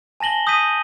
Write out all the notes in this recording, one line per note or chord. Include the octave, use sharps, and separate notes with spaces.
G#5 A5 A#6 F#7 G7
D#6 G6 A#6 B6 D#7